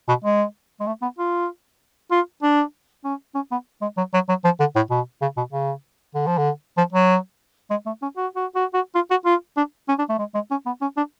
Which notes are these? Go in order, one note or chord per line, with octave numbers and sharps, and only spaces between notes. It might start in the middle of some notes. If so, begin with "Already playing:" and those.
B2
G#3
G#3
A3
B3
F4
F4
D4
C#4
C#4
B3
G#3
F#3
F#3
F#3
F3
D3
A2
B2
C#3
B2
C#3
D3
F3
D3
F3
F#3
G#3
A3
C#4
F#4
F#4
F#4
F#4
F4
F#4
F4
D4
C#4
D4
A3
G#3
G#3
C#4
B3
C#4
D4